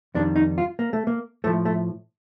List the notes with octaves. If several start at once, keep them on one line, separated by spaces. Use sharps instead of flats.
F2 D#3 G3 D4
D#4
F4
A#3
A3
A#3
A2 F3 A3
A3